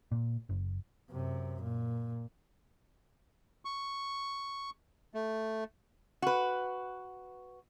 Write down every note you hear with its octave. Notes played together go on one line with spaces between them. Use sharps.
A#2
F#1
F#2 C3
A#2
C#6
A3
F#4 B4